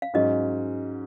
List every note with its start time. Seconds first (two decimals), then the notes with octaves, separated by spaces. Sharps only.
0.02 F5
0.14 G#2 F#3 C#4 D#5